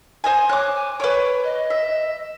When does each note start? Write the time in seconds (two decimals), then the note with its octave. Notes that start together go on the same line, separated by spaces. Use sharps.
0.24 C5 D#5 G#5
0.49 C#5 D6 F#6
0.75 G#5
1.00 B4 C#5 C#6 D6
1.44 D#5
1.70 E5